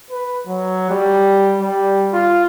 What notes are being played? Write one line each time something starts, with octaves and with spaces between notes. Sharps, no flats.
B4
F#3
G3
G3
F4